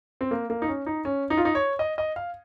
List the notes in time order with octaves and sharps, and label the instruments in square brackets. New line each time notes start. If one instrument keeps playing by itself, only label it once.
[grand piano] C4
A#3
A#3
D#4
C#4
D#4
C#4
D#4
F4
D#4
C#5
D#5
D#5
F5